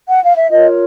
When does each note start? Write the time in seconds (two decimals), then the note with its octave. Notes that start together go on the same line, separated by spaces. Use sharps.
0.08 F#5
0.22 F5
0.36 E5
0.50 F4 A#4 C#5 D#5